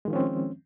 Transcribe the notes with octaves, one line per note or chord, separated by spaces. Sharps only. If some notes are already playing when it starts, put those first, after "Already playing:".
D#3 F3 G#3 C4 C#4